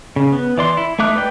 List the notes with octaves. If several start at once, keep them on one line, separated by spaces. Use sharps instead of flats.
C#3
B3
E3 D5 C6
E4
A3 D#4 E5 D6 F#6
B4 D5 G5